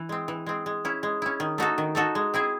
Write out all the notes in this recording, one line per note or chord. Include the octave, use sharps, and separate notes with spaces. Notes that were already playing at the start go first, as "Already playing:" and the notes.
Already playing: E3
G#3 C4
E3
G#3 C4
G#3
C#4 E4
G#3
C#4 E4
D#3
A3 D#4 F#4 A4
D#3
A3 D#4 F#4 A4
G#3
C4 E4 G#4